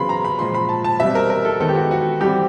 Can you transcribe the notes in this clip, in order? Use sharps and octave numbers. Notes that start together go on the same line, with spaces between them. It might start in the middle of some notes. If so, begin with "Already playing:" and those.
Already playing: C#3 F#3 B3 B5 C6
A#5
B5
A#2 F3 G#3 C6
B5
A5
A5
B2 G3 C4 E5
A#4
A#4
A4
D#3 G#3 B3 A4
G4
F#4
F#4
E3 G3 C4 G4